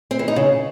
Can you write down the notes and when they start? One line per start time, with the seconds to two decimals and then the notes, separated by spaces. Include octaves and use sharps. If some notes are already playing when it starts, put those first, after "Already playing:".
0.11 C4
0.19 E3
0.28 D#4
0.36 C#3